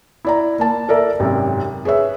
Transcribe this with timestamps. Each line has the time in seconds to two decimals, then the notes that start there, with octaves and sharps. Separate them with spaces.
0.25 E4 D5 A#5
0.59 A#3 A5
0.89 A4 A#4 D5 E5
1.20 G#1 F#2 C3
1.85 G#4 B4 C#5 E5